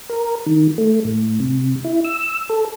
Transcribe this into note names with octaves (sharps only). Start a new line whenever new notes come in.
A#4
D#3
A3
A2
C3
E4
E6
A4